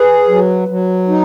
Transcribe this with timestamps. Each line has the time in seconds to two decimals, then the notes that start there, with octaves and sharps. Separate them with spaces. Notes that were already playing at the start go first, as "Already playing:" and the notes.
Already playing: G#4 B4
0.28 F#3
0.68 F#3
1.08 D#4